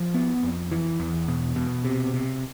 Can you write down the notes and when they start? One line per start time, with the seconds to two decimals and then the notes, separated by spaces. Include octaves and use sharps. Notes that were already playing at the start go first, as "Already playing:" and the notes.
Already playing: F3
0.14 B3
0.43 F2
0.71 E3
1.00 E2
1.28 B2
1.56 B2
1.85 C3
2.14 C3